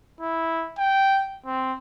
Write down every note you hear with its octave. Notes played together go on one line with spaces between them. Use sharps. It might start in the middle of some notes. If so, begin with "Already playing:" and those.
E4
G5
C4